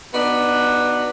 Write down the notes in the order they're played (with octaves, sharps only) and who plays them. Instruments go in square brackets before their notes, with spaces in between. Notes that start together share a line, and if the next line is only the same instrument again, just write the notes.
[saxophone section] B3 D4 D#4 F#4